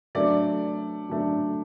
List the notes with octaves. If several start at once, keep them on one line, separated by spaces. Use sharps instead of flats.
F#3 A3 D4 D5
F#3 A3 D4